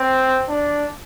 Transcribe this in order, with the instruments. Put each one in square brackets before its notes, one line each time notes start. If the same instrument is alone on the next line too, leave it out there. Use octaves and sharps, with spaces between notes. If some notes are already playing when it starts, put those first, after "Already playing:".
Already playing: [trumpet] C4
D4